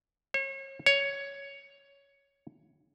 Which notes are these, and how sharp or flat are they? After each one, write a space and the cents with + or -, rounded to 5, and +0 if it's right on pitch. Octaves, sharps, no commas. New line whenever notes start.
C#5 -35
C#5 +10